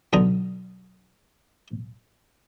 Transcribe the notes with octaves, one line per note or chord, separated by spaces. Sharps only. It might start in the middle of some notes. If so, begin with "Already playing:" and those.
B1 D3 A#5 D#6